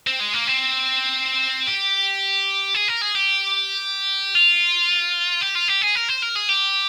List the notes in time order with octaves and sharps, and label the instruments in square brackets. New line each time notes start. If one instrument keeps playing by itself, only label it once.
[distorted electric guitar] C4
G#3
A#3
C4
G4
G#4
A#4
G#4
G4
F4
G4
F4
G4
G#4
A#4
C5
A#4
G#4
G4